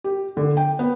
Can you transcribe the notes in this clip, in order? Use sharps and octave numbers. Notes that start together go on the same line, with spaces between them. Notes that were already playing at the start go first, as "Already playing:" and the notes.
G4
D3
G5
B3